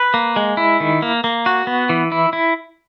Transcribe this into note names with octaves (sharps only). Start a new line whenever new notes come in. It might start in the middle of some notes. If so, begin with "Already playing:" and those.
Already playing: B4
A#3
G#3
E4
D#3
A#3
A#3
F#4
B3
E3
E4
E4